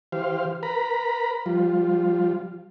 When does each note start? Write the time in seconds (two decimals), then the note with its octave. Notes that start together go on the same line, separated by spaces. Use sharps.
0.12 E3 G4 C5 F5
0.63 A#4 B4 A#5 B5
1.46 F3 G3 F4